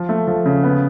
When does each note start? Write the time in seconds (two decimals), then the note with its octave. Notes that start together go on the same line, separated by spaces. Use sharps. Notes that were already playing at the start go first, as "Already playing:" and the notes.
Already playing: F3
0.09 A3
0.27 F3
0.45 C#3
0.63 B3